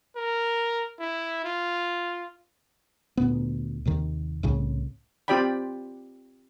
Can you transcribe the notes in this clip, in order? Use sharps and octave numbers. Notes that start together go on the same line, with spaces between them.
A#4
E4
F4
D2 A#2 B3
D#2 C3 D#3
C2 A2 C#3
C4 F4 G4 D5 G5 B5